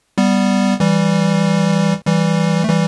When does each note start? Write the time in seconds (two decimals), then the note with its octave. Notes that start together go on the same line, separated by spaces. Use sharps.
0.18 G3 B3
0.80 E3 G3
2.06 E3 G3
2.64 A3
2.69 E3 G3